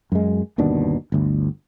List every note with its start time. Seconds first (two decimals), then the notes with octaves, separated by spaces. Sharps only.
0.12 F#2 G#3
0.58 G1 D#2 B2 D4
1.12 G1 D2